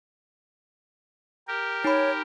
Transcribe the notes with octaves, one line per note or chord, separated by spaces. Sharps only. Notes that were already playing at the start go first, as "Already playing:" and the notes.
G4 A#4
D#4 C#5 B5